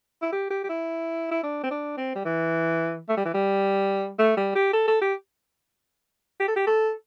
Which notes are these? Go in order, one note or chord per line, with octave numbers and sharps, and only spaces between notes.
E4
G4
G4
G4
E4
E4
D4
C4
D4
C4
G3
E3
A3
G3
E3
G3
A3
G3
G4
A4
A4
G4
G4
A4
G4
A4